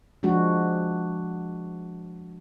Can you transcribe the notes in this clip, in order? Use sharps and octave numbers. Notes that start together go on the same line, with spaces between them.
F3 G#3 D4 F#4